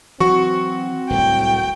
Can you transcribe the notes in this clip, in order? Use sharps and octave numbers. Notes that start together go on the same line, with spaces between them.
E3 F#3 C4 F#4 C#6
D1 C2 G5